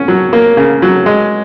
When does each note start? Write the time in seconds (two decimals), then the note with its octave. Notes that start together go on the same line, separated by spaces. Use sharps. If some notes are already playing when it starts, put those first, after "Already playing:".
Already playing: C#4
0.08 F#3
0.33 A#3
0.57 C#3
0.82 F#3
1.06 G#3